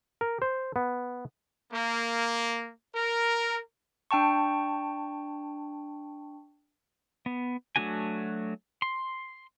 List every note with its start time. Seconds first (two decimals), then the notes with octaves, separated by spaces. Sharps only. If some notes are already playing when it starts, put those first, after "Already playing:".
0.21 A#4
0.42 C5
0.76 B3
1.72 A#3
2.93 A#4
4.11 D4 G5 A5 C#6
7.26 B3
7.76 F#3 A3 D4 F#4 G#5
8.82 C6